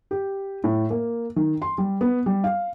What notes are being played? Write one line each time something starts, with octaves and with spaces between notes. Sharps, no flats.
G4
A2
A#3
D#3
C6
G3
B3
G3
F5